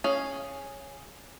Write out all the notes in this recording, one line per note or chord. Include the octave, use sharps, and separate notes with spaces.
C#4 G#4 F5